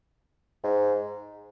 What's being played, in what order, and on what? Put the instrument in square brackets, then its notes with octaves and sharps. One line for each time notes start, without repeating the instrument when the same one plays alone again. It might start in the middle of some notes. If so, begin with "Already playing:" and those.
[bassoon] G#2